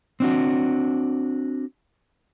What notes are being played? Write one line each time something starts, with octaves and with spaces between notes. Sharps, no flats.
C4 D4 F#4